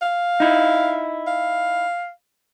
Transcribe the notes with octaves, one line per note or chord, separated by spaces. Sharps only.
F5
D#4 E4
F5